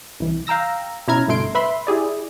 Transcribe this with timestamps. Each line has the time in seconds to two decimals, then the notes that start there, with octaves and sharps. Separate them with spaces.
0.20 C2 E3
0.47 F5 G5 A#5 E6 A#6
1.08 B2 C#4 E4 A#5 F6 G#6
1.27 G1 G2 B2 A3 C6 D7
1.55 B4 E5 B5 C6
1.87 E4 G4 G#4 D5